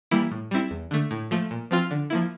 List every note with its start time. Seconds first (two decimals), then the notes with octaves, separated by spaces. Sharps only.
0.11 E3 G3 A#3 E4
0.32 A2
0.51 G3 C4 E4
0.71 E2
0.91 D3 A3
1.11 A2
1.31 F3 A3
1.51 A#2
1.71 F3 C4 F4
1.91 D3
2.10 F3 A#3 E4